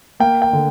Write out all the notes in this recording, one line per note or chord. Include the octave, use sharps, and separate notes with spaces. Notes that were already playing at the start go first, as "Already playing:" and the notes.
A#3 G5
G5
D3